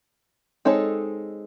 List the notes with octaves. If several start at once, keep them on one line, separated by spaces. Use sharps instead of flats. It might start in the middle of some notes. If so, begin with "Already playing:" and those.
G#3 C4 D#4 A4 C#5